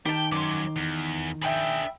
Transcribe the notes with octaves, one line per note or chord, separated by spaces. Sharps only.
D#3 G4 G5 A5
F#3 C#4 C6 D6
E2
D4 G#4 E5 G5 B5